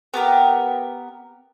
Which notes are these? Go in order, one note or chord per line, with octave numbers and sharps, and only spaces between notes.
B3 G4 A#4